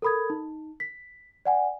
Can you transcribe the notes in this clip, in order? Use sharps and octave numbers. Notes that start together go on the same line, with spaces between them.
A4 A#4 B5 D#6 G#6
D#4
B6
D5 F#5 G#5